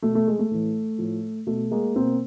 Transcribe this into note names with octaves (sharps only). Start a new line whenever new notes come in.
B2 A3
A3
G#3
A3
A2 E3
A2 F3
B2 A3
G#3 A#3
B2 A#3 C4